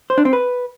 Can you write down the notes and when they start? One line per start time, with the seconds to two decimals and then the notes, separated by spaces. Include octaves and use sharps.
0.10 C5
0.18 D4
0.25 C4
0.33 B4